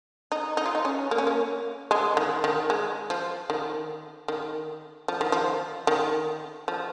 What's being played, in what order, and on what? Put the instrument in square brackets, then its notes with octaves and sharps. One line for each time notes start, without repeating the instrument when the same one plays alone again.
[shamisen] D#4
D#4
F4
D#4
C#4
A#3
C#4
A#3
G#3
D#3
D#3
G#3
F3
D#3
D#3
F3
D#3
F3
D#3
F3